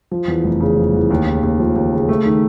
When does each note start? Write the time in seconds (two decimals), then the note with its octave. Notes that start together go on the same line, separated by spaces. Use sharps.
0.11 F3
0.28 E2
0.44 F1
0.61 C#3
0.77 F3
0.94 E2
1.11 D#2
1.27 C#3
1.43 D#2
1.60 F3
1.76 D#2
1.92 C#3
2.09 A3
2.25 D#3